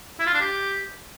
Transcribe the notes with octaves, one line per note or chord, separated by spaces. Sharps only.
E4
F4
D4
G4